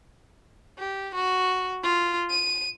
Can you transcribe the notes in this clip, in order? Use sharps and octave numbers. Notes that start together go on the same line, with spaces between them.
G4
F#4
F4
D#7